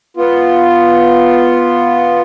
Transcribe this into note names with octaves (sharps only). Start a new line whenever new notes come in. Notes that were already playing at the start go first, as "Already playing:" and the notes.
B3 F4